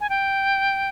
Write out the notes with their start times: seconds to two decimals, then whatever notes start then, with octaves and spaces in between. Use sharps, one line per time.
0.01 G#5
0.09 G5